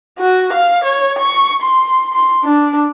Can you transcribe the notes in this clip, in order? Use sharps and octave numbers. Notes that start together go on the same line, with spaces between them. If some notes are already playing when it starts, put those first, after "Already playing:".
F#4
F5
C#5
C#6
C6
C6
D4